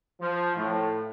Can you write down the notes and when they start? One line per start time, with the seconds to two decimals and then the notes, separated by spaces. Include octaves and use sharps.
0.21 F3
0.57 A2